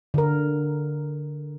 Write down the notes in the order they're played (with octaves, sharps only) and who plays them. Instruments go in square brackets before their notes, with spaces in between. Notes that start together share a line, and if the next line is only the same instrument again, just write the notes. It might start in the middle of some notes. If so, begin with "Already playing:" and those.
[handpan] D3 A#4